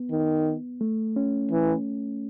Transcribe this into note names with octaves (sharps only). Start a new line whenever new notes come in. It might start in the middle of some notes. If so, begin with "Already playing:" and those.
Already playing: B3
D#3
A3
C#4
E3